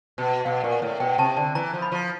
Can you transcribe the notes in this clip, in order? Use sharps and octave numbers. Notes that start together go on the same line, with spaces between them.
B2
B2 F5
A#2
F#5
A2
B2 G5
C3 A5
D3 A5
E3 A#5
F3
B5
F3